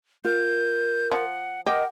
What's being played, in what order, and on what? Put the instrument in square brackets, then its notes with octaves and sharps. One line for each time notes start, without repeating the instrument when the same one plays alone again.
[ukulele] F4 [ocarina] A#4 [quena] G6
[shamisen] F3 [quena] F#5
[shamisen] G4 [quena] A#4 [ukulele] D#5 [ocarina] F#5